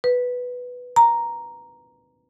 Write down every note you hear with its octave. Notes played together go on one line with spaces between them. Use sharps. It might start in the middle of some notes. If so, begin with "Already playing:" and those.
B4
A#5